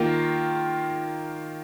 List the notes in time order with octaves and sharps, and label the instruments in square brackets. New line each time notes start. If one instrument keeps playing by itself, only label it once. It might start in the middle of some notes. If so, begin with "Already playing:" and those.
Already playing: [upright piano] D#3 A#3 F4